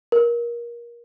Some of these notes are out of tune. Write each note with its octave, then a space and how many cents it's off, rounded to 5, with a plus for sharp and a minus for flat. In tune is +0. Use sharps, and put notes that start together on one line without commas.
A#4 +25